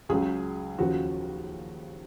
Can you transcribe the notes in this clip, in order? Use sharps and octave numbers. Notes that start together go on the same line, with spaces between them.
C#2 C#3 F#3 G#4
D#2 C#3 F3 F#4